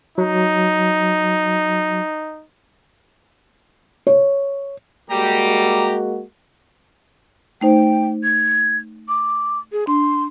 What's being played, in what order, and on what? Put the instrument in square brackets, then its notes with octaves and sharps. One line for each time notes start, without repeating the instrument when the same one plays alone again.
[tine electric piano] F#3 [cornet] D#4
[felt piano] C#5
[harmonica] G3 G4 A#5 [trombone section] G#3 A#3 F#4
[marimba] A3 D#4 C5 [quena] G5
[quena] G#6
D6
G#4
[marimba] D4 [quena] C6